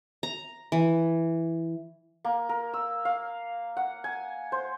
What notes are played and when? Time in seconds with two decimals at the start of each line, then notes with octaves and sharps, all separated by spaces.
0.23 A#5
0.72 E3
2.25 A#3
2.49 A#4
2.74 E6
3.05 F5
3.77 F#5
4.04 G#5
4.52 C5